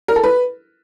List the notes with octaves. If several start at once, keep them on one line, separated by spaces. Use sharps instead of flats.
A#4
A4
B4